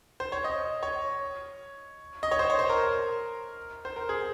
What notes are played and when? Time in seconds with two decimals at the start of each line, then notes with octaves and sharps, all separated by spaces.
0.20 C5
0.32 C#5
0.44 D#5
0.83 C#5
2.23 D#5
2.31 C#5
2.39 C5
2.50 C#5
2.59 C5
2.70 A#4
3.85 C5
3.96 A#4
4.09 G#4